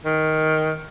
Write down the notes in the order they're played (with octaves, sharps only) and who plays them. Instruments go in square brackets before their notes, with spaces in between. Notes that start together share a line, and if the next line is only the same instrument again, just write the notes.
[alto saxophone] D#3